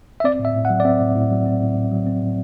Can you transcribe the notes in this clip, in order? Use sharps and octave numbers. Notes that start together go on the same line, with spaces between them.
E5
C4 D5
A2
E5
A2
F#5
F#3
D5
C4 E5
A2
A2
F#3
C4
A2
A2
F#3
C4
A2